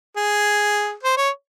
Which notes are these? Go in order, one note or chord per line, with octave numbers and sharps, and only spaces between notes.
G#4
C5
C#5